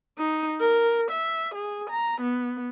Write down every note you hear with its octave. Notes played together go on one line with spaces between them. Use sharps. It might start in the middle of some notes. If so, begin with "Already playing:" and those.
D#4
A#4
E5
G#4
A#5
B3